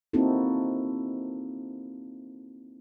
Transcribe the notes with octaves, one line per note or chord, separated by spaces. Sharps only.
A#3 C4 D#4 E4 F#4 A4